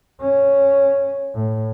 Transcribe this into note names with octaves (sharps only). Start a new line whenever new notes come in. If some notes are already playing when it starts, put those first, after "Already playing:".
C#4
A2